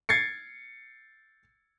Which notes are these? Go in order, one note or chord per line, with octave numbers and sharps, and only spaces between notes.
G#6 A6 C7 C#7